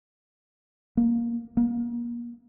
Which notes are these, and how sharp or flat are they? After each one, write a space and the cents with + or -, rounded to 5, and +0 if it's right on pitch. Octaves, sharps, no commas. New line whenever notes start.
A#3 +10
A#3 +35